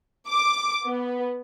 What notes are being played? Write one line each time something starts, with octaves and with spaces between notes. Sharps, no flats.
D6
B3